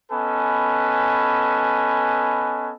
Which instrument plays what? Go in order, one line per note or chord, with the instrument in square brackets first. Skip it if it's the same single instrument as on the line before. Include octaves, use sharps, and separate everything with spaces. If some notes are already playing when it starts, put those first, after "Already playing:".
[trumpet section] B3 C#4 A4 B4 D#5 G#5